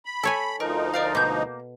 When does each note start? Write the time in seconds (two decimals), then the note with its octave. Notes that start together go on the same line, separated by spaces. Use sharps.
0.06 B5
0.23 A4 C#5 G#5
0.60 D2 F3 D#4 A#4
0.94 A#4 D5 F5
1.15 B2 A#3 G6